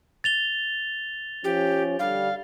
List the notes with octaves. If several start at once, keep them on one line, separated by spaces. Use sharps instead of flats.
A6 F7 G7
F3 C#4 G4
D3 G3 F5